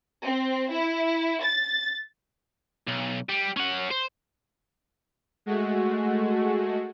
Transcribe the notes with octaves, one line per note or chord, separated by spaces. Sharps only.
C4
E4
A6
B1
G3
C#4 F#5
C5
G#3 A3 F#4